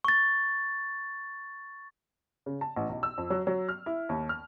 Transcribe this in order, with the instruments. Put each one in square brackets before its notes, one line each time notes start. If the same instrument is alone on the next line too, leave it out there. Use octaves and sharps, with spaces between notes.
[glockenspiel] C#6 A6
[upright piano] C#3
A5
A1
B1
E6
F2
F#3
F#3
F6
E4
D#2
F6